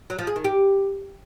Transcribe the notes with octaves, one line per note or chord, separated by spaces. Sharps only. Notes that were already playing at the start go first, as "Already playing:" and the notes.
F#3
F3
G#4
D#3
G4